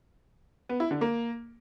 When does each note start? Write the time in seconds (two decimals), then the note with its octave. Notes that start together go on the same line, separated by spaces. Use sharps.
0.69 B3
0.80 E4
0.91 D3
1.01 A#3